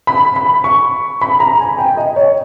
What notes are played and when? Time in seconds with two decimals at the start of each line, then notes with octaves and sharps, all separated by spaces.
0.07 B5
0.36 B5
0.64 C#6
1.21 B5
1.40 A#5
1.60 G#5
1.79 G5
1.97 D#5
2.16 C#5